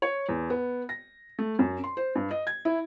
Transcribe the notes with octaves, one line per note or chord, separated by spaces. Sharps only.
C#5
E2
B3
A#6
A3
F#2
C6
C5
G2
D#5
G#6
E4